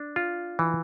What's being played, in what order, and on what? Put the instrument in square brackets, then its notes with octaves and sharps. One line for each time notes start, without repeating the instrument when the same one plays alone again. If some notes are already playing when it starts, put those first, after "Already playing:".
Already playing: [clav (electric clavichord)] D4
F4
E3